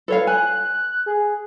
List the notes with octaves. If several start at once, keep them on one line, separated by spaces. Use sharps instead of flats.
A4 B4 C#5 F5
G#5 F#6
G#4